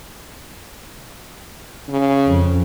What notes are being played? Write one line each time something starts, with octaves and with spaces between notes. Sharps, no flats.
C#3
F2